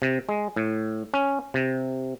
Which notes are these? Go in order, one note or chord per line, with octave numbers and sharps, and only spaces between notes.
C3
G#3
A2
C#4
C3